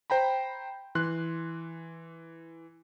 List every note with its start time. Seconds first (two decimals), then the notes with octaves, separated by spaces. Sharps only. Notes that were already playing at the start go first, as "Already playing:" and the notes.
0.10 C5 G5 A#5 B5
0.95 E3 C6 F#6